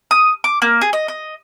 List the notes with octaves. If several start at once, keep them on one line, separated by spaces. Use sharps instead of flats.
D#6
D6
A#3
G#4
D#5
D#5